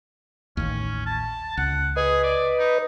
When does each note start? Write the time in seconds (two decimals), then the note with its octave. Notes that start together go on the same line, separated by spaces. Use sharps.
0.57 A1 D#2 C#4
1.06 A5
1.57 C#2 F#5
1.96 G#4 B4 D#5
2.23 D5
2.59 D#4